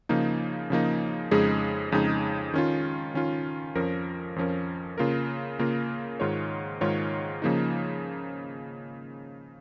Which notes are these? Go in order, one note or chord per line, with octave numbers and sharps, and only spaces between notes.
C#3 F3 A#3 D#4
C#3 F3 A#3 D#4
F2 C#3 G#3 D#4 G#4
F2 C#3 G#3 D#4 G#4
D#3 C#4 F4
D#3 C#4 F4
F2 F3 C#4 A#4
F2 F3 C#4 A#4
C#3 A#3 F4 A#4
C#3 A#3 F4 A#4
G#2 D#3 G#3 F4 C#5
G#2 D#3 G#3 F4 C#5
C#3 F3 A#3 D#4